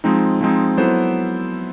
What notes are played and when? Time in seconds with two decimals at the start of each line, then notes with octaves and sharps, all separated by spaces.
0.04 F3 G#3 C4 D#4
0.41 F3 G#3 C4 D#4
0.77 F#3 B3 E4 A4 C5